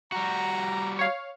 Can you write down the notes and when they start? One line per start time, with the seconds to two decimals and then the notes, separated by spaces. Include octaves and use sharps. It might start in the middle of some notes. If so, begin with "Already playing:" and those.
0.12 G3 F#4 A#5
0.99 C#5 F5